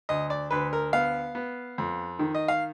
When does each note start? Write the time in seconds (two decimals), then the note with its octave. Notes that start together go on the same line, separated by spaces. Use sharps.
0.09 D2 D#5
0.30 D5
0.51 D2 B4
0.73 A#4
0.93 B3 F5
1.35 B3
1.78 F2
2.19 D#3
2.35 D#5
2.48 F5